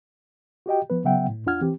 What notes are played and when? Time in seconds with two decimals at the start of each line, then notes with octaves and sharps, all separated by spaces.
0.66 F#4 G4 D#5 G5
0.90 F3 B3 B4
1.04 C#3 F#3 B3 E5 F#5 G5
1.28 A2
1.46 E2 D4 F4 F#5 F6 G#6
1.61 E3 C4 G4